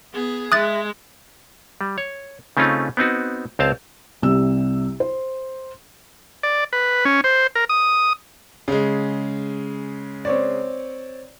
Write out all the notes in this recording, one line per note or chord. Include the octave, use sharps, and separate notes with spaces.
B3 G#4
G#3 E5 D#6 F#6 A6
G3
C#5
C#3 A3 C4 C#4 D#4 F4
B3 C4 D#4 F#4
C#2 C4 C5 F5 A5
C2 C3 E6
C5
D5
B4
C#4
C5
A#4
D#6
C#3 G#3
C4 C#5 D5